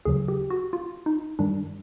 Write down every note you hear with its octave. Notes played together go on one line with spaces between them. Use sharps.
D#2 C#3 F#3 G#4
G4
F#4
F4
D#4
G2 D#3 G3 D4